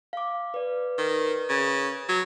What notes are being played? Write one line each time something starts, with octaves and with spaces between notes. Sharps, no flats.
F5 D6
B4 D5
D#3
C#3
F#3